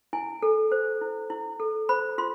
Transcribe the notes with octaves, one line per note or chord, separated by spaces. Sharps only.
E4 G#5
A4
C5
E4
E4
A4
C5 B5
F4 C6